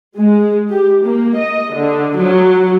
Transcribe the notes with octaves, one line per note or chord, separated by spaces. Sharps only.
G#3
G4
A#3
D#5
D3
F#3